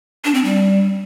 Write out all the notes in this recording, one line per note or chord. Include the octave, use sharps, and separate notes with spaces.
D4
C4
G3